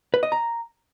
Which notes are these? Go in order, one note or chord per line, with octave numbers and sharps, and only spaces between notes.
B4
D#5
A#5